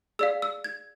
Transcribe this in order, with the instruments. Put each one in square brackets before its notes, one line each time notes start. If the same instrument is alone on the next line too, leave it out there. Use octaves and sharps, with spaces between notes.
[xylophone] G#4 D5 F5 E6
E6
G#6